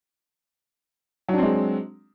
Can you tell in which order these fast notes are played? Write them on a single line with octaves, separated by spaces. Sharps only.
F#3 D4 C4 G#3